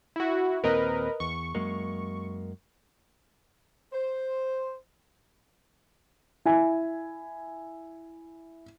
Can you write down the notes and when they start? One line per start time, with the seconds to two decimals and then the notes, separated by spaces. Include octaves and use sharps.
0.16 E4 F#4
0.64 D#2 A#2 C4 A#4 B4 D#5
1.20 E2 C#6
1.55 F#2 G#3 A#3
3.93 C5
6.45 E4 G#5